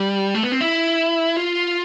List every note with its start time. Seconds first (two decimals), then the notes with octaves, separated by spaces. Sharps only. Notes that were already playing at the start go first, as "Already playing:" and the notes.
Already playing: G3
0.35 A3
0.43 B3
0.52 C4
0.61 E4
1.37 F4